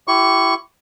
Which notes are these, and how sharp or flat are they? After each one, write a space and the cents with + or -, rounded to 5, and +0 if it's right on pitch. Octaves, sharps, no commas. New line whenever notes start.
E4 +20 G4 -20 C#6 +0